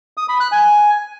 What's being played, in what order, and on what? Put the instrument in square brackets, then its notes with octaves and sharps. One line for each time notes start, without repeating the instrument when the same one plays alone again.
[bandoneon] D#6
B5
F#6
G#5